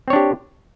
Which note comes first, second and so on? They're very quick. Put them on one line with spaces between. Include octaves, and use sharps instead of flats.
C4 C#5 D4 G4